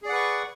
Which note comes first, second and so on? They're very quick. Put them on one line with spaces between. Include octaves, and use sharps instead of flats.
G#4 D5 F#5 B4 C#6